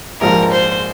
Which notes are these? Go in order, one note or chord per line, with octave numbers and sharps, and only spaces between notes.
A#1 G#2 F3 A#4
C5